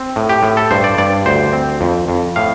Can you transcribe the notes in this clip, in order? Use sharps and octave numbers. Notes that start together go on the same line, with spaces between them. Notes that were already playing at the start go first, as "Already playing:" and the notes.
Already playing: C4
A2
G4
A2
A4
G2 C5
D5
G2 D5
D2 C5
C4
F2
F2
A2 F5